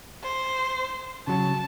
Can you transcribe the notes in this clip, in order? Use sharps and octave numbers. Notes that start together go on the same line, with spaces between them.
C5
C#3 F#3 A5